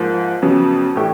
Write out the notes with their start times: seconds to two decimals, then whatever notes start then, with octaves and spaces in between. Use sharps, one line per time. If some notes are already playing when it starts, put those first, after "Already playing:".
Already playing: G#2 F3 A#3
0.42 F2 C#3 F#3 B3
0.96 A2 E3 A3 D4 G4